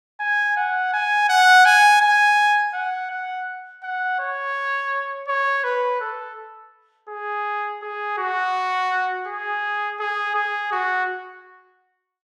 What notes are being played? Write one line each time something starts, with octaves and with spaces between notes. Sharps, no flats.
G#5
F#5
G#5
F#5
G#5
G#5
F#5
F#5
F#5
C#5
C#5
B4
A4
G#4
G#4
F#4
G#4
G#4
G#4
F#4